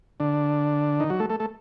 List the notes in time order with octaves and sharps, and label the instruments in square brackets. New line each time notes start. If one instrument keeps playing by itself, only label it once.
[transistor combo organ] D3 D4
D#3 D#4
F#3 F#4
A3 A4
A3 A4
A3 A4